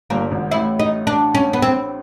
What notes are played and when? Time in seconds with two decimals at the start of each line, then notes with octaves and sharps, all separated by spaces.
0.10 G1 G2 A#3
0.31 G#1 G#2
0.51 A1 A2 E4
0.79 D#4
1.07 D4
1.35 C#4
1.53 B3
1.62 C4